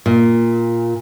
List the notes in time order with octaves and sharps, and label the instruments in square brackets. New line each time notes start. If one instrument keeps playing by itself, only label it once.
[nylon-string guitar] A#2